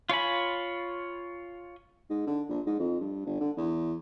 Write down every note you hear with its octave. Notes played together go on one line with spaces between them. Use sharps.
F4 C#5 G#5 B5
G#2
D3
A#1
G#2
F2
G2
G1
D3
E2